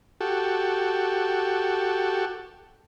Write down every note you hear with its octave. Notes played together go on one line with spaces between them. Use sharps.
F#4 G4 A4